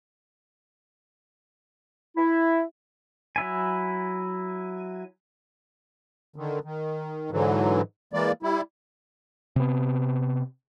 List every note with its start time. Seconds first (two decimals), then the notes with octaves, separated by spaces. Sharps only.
2.16 E4
3.36 F#3 E4 G#5
6.36 D3 D#3
6.64 D#3
7.31 G#2 D3 E3 F#3
8.13 E3 G#3 A#3 D5
8.43 G3 E4
9.56 C3 B3